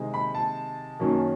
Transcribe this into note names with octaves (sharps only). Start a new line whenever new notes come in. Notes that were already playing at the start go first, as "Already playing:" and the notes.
Already playing: C3 D#3 G#3 C4
B5
A5
F#2 D#3 F#3 A#3 C#4